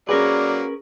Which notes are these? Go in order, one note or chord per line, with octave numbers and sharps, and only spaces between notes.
F#3 A#3 C#4 G#4 A#4 B4 D5